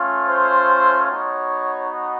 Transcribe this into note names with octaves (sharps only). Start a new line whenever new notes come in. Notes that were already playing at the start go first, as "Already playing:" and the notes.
Already playing: A3 C#4 F4
C5
B3 D#4 F#4 C#5